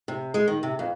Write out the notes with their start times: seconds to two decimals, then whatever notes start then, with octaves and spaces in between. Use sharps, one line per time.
0.08 C3
0.34 G#3
0.48 D#3
0.63 C3
0.79 F2